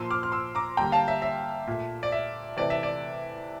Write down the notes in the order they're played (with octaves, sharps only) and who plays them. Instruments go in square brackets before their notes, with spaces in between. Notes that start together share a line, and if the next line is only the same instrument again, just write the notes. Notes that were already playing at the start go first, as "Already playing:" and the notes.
Already playing: [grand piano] A#2 F3 A#3 C6 E6
D6 F6
F6
C6 E6
A#5 D6
D3 G3 A#3 G5 A#5
F5 A5
E5
E5
A#2 A3
D5
E5
C3 E3 A3 D5
E5
D5